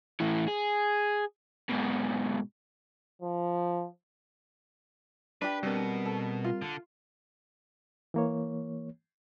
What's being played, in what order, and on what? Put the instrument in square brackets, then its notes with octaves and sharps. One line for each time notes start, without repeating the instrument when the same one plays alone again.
[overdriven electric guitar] A2 E3
G#4
G#2 B2
[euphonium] F3
[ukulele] D4 G4 [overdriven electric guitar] B4
[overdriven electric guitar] B2 [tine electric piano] G3 C4 A#4
[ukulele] A4
F4
[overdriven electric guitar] D3
[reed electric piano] E3 A#3 C#5